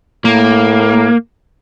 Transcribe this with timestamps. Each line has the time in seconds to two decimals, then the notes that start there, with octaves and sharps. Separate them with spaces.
0.25 A2 A#3